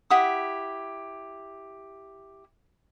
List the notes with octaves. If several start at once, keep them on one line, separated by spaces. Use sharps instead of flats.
E4 G4 F#5 D#6